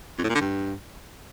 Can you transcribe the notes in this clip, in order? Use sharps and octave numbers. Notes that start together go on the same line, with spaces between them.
F2
A2
A#2
D3
G2